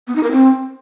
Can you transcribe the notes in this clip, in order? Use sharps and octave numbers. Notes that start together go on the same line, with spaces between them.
B3
D#4
A#4
C4